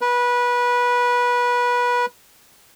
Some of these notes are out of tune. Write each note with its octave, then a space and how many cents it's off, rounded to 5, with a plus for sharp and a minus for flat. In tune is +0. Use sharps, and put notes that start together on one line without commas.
B4 -20